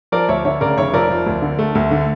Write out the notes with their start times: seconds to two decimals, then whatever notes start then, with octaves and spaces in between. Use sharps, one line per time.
0.12 F3 A#4 D5
0.29 D2 C#5 E5
0.45 D3 C#5 E5
0.61 C#3 A#4 D5
0.77 F1 C#5 E5
0.94 F2 A#4 D5
1.10 F3
1.26 D2
1.42 D3
1.59 A3
1.75 D2
1.91 D3